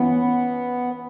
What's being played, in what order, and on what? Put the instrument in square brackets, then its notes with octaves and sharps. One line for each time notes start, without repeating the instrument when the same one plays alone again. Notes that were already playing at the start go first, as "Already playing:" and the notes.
Already playing: [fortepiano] E3 C#4 [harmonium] B3